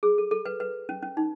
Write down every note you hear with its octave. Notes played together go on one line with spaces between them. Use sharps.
G#4
A4
A4
B4
B4
C#4
C#4
D#4